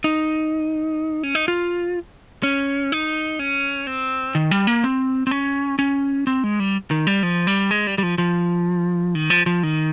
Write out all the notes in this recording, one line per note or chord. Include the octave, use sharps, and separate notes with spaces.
D#4
C#4
D#4
F4
C#4
D#4
C#4
C4
D#3
G3
A#3
C4
C4
C#4
C#4
C4
G#3
G3
D#3
G3
F3
G3
G#3
G3
G3
F3
F3
D#3
F3
F3
D#3